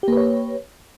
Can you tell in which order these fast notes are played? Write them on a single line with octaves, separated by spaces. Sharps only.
G4 A#3 B4 C#5